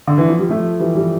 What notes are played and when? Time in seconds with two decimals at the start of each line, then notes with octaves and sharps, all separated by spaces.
0.08 D3
0.18 E3
0.29 F3
0.39 G3
0.49 F3 A3
0.79 E3 G3
0.95 E3 G3